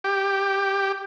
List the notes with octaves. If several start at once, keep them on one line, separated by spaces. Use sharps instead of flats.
G4